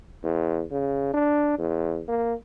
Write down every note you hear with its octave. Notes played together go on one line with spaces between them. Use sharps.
E2
C#3
D4
E2
A#3